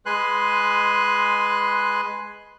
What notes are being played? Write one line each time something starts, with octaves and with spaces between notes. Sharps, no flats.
G#3 B4 G#5 C6 F#6